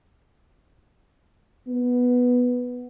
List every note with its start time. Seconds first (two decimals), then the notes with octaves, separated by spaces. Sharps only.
1.67 B3